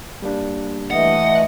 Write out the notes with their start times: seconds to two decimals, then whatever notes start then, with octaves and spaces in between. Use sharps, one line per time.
0.22 G3 A#3 D4
0.91 E3 A3 D#5 F#5